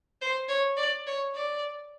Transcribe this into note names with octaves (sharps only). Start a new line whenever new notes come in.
C5
C#5
D5
C#5
D5